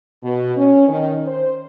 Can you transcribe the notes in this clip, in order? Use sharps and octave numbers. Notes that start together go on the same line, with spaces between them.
B2
C#4
D#3
C5